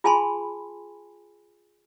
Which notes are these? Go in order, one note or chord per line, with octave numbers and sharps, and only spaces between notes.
F4 G#4 G#5 A5 B5 C6